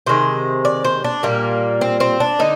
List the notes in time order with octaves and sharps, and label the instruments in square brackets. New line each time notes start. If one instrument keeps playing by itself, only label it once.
[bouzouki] C3 D#3 G#3 C5
D5
C5
D4
A#2 G3 A#3
C4
C4
D4
D3 D#4